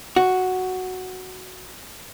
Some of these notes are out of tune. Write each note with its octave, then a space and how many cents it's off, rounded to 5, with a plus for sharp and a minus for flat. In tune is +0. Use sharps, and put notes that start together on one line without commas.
F#4 +0